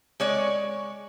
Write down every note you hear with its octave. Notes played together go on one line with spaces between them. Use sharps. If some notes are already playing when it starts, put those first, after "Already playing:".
G#3 C#5 D5